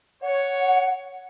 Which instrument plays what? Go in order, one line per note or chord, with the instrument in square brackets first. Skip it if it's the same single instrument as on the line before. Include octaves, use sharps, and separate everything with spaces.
[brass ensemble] C#5 [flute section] F#5